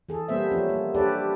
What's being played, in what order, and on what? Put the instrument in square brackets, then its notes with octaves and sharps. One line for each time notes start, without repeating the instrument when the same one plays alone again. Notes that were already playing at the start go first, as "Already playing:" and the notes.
[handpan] E3 G#4 A4
G3 A#3 B3 C5 E5
F3 C#4
A#3
D4 G4 A4 B4 D5